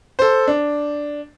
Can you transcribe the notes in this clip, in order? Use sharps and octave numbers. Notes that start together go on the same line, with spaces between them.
A4 C5
D4